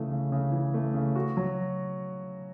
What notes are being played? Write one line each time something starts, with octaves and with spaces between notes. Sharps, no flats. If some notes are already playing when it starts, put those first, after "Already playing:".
Already playing: C#3 E3 A3
C#3
C#3
E3
A3
C#3
F#4
F#3